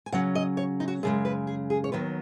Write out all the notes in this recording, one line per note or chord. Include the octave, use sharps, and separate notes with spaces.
G#5
C#3 F#3 C#4 F#5
D#5
C#5
D#4
F#4
F#2 C#3 G#3 G#4
B4
G#4
G#4
C#5
D#2 D#3 F#3 B3 B4